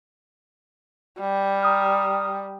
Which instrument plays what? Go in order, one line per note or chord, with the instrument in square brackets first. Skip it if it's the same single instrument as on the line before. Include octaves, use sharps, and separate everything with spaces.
[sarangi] G3
[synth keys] A#5 D#6 F6